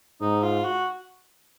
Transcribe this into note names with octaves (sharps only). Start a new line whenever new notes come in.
G#2 D#4
F4
F#4